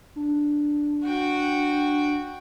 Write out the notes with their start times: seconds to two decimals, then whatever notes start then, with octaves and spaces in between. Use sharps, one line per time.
0.16 D4
1.04 F#4 G5